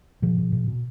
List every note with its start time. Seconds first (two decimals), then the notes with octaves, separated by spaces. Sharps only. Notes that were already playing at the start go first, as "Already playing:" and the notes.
0.22 B2 F3
0.38 B2
0.52 B2
0.68 B2